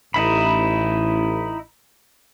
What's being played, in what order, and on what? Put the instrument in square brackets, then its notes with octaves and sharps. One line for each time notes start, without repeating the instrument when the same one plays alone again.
[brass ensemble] A1 [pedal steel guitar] D#4 E4 B5